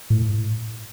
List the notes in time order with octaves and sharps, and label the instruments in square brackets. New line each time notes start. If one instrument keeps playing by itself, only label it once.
[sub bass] A2